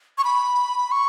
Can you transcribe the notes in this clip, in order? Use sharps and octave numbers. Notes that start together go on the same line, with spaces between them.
C#6
B5
C#6